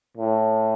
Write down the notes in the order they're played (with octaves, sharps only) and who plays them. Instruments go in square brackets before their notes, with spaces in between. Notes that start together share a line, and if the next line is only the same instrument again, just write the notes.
[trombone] A2